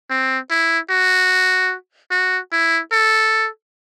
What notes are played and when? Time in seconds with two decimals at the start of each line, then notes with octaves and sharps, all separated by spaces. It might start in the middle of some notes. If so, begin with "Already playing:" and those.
0.10 C4
0.51 E4
0.90 F#4
2.11 F#4
2.52 E4
2.92 A4